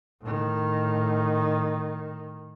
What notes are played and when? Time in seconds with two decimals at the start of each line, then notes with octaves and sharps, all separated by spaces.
0.22 A2 D#3